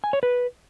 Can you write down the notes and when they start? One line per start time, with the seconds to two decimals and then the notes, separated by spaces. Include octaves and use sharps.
0.04 G#5
0.13 C#5
0.23 B4